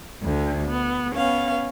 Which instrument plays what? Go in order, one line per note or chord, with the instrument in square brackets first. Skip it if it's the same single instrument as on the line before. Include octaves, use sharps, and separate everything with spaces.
[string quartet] D2 D3
B3
B3 C#4 F5